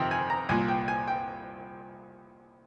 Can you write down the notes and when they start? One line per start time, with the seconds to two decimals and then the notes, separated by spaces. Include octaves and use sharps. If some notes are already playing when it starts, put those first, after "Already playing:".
Already playing: F2 C3 D#3 G5
0.11 G#5
0.30 A#5
0.49 C2 A#2 G#5
0.68 G5
0.88 G#5
1.08 G5